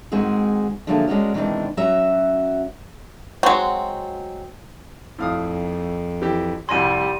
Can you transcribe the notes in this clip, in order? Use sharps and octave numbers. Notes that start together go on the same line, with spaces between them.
G#2 D#3 G#3 C4 F#4 G#4
D3 F3 F#3 A3 A#3 G#4
G#3 B3 C#4 D4 F#4 A#4
B2 D#3 E3 G#3 C4 D4
F#3 C#4 F#4 E5
F#3 G#3 C4 F#4
F2 A2 F5 D#6
E3 G4
C2 F2 G3 G#5 C6 A#6 D#7